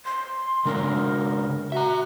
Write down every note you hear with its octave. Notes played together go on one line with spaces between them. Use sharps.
C6
C#3 G#3 D4 A#4
F#4 E5 A#5